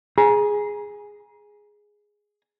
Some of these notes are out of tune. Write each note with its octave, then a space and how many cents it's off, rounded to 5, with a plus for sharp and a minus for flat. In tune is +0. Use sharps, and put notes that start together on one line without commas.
G#4 +0 A#5 +35